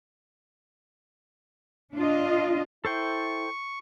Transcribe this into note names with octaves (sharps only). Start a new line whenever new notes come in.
D4 F4 D#5
E4 A4 C5 G5 C#6